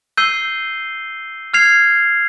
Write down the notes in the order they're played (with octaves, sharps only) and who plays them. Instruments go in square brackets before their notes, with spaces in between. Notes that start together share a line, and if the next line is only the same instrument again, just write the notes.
[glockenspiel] E6 G6 C7 D#7 G7
F6 G#6 C7 F7